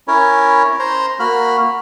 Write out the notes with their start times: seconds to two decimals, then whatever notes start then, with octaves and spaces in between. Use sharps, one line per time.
0.08 C#4 E4 A#4 C#5
0.79 C5 A#5 C6
1.20 A#3 F#4 B5 F6